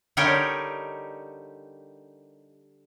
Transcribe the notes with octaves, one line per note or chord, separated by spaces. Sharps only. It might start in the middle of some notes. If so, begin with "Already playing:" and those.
D3 G3 D#4 G4 A#4 C#5